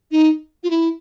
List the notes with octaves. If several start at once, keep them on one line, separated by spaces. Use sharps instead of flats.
D#4
F4
E4